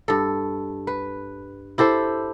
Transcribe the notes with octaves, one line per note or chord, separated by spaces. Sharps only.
G2 A4
B4
E4 G4 A4 C5